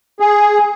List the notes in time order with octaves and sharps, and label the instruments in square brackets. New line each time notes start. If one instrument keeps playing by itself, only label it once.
[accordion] G#4